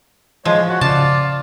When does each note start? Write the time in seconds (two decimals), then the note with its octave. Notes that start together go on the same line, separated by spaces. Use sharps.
0.45 F3 G#3 C#5
0.69 F#4 F#5
0.81 C#3 F4 D5 A5